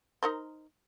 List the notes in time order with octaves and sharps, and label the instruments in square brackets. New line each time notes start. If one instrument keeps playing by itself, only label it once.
[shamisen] D#4 A#4 C5